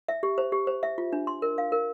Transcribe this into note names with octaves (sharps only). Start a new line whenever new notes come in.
E5
G4
C5
G4
C5
E5
F4
D4
C6
A#4
F5
A#4